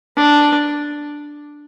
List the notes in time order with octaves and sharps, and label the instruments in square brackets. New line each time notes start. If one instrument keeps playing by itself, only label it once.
[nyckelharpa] D4